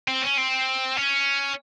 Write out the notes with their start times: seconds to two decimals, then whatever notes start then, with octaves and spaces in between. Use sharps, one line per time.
0.08 C4
0.23 C#4
0.38 C4
0.97 C#4